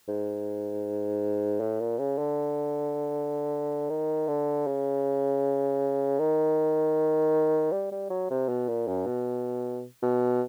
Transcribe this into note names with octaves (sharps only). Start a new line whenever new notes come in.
G#2
A2
A#2
C#3
D3
D#3
D3
C#3
D#3
G3
G3
F#3
C3
B2
A#2
F#2
B2
B2